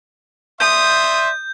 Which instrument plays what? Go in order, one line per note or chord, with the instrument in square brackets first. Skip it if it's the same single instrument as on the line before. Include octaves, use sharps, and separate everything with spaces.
[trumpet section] D5 E5 C6 [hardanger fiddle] D#6 [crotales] G6